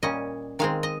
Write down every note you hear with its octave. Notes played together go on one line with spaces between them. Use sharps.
A#2 G3 C#4 D#5
D#3 G#3 C4 F5
D#5